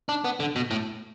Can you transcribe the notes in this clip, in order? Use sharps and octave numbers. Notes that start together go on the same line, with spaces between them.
D4
B3
D3
B2
A2